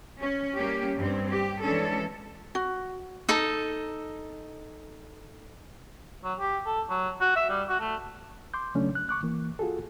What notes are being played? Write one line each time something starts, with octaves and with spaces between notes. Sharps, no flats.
C#4
G3 A#3 C#4 G4
G2 C4
G4
E3 G#3 C#4 D4 A4
F#4
D#4 A4
F#3
G4
A4
F#3
F#4
E5
G3
F#4
A3
C6 D6 G6
C#3 F#3 A3 C#4 D4
F#6
C#6 D6 F#6
E3 A#3
F4 F#4 G#4 A4